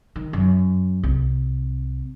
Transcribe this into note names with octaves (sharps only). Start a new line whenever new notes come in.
D#3
F#2
C2